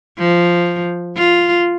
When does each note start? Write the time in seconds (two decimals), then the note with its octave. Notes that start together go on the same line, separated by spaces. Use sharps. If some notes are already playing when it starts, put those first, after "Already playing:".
0.18 F3
1.17 F4